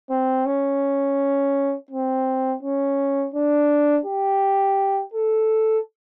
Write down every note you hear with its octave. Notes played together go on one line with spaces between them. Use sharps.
C4
C#4
C4
C#4
D4
G4
A4